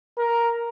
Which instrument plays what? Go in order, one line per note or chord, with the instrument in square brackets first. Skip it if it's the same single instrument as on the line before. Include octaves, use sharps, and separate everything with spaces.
[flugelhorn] A#4